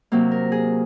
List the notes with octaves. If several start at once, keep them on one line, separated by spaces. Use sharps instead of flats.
C3 F#3 A#3
A#4
G#4